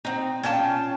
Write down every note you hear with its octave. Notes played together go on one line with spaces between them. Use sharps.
C4 D#4
C#4 F4 G5 A5